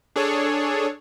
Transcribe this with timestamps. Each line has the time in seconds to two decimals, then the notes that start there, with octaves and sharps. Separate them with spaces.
0.16 D4 G#4 A4 C#5